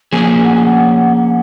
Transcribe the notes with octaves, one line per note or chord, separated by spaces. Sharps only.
F3 A#3 C#4 G#4 G#5
F#5
G#5
F#5